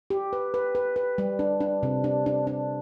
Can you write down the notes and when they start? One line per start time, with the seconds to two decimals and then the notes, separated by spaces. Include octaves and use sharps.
0.10 G4
0.33 B4
0.54 B4
0.75 B4
0.96 B4
1.18 G3
1.39 D4
1.61 D4
1.83 C3
2.04 D4
2.26 D4
2.47 D4